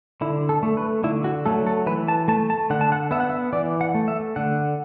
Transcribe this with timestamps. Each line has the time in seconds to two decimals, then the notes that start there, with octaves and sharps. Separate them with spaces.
0.21 D3 E4
0.49 A4
0.63 A3
0.77 B4
1.04 D3 E4
1.24 F#4
1.46 F#3 A3 A4
1.67 A4
1.86 E3 B4
2.08 A5
2.28 A3 A5
2.50 A5
2.70 D3 F#5
2.81 A5
2.92 F#5
3.11 B3 E5
3.20 F#5
3.30 E5
3.53 E3 D5
3.81 F#5
3.95 A3
4.08 E5
4.36 D3 F#5